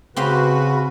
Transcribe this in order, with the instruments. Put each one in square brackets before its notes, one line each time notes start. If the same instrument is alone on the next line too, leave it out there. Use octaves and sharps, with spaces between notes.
[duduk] C#3 [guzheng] C4 G4 F5 [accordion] F#4 B4